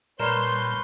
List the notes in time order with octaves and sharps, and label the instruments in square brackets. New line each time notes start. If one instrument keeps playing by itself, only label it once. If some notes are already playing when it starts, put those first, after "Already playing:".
[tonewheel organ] A#2 G3 A5 [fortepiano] A#4 [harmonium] B4 C#5 [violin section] C6 G6